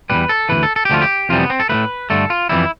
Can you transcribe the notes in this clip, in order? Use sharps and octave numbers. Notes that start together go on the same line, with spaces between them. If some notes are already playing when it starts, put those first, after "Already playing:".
E2 B2 G3 B4
A4
C3 E3 B4
D2
A4
A4
G4
D2 D3 F3 A3 F4
G4
F2 C3 E3 G3 F4
B3
C4
A4
A2 F3 A3 B4
G2 D3 A3 A4
F4
F2 E3 G3 E4